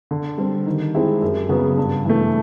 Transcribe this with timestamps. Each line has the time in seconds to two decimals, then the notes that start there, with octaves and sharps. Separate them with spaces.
0.11 D3
0.38 G3 C4
0.66 D#3
0.94 G#3 C4 E4 G4
1.22 F#2
1.49 C#3 F#3 B3
1.77 G2
2.05 E3 A3